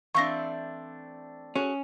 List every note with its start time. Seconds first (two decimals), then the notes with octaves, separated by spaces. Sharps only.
0.15 E3 A3 C4 D4 E5 F5 C#6 A#6
1.56 C#4 F#4 G#4 A4